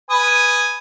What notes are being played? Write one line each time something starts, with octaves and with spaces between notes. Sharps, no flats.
B4 G#5 D#6